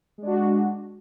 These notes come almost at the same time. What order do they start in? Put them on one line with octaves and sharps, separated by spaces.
G#3 D4 F#4